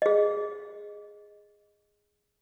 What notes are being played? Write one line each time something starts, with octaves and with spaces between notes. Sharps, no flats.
G#4 D#5